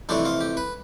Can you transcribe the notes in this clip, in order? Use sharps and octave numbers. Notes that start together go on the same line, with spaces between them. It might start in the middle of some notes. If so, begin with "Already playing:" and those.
F2 C3 E3 A3 D4
F4
G4
B4